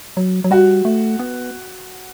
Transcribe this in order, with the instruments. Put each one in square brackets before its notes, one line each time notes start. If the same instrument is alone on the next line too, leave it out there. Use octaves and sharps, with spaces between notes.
[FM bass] F#3
F#3
[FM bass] G3 [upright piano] F#4
[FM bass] A3
B3